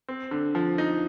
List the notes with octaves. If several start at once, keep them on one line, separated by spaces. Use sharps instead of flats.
C4
D3
F3
D#4